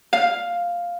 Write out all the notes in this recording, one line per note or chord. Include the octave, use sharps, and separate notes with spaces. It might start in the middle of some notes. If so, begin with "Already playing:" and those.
F5